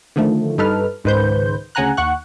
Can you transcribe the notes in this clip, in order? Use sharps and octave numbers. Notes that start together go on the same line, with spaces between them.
D3 D#3 F3 A3
G2 D#4 A4 B4 F6
C#2 G#2 D#3 B4 C5 G6
D2 C#3 F#5 G#5 A#5 F#6
D#2 F#5 C#6 F#6